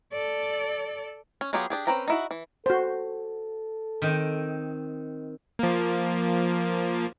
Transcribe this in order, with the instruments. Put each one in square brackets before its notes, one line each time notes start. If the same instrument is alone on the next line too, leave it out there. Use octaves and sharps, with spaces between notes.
[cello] A4 D5
[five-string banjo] C#4
F#3 B3 F4 G4 G#4
D4 G4 G#4
C4 C#4 B4 G5 A#5
D#4 E4 F#4
E3
[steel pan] F#4 C5 [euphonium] A4
[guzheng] D#3 C4 D#5
[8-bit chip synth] F3 A#3